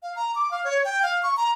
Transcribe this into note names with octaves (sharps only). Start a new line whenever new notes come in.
F5
A#5
D6
F5
C#5
G5
F5
C#6
A#5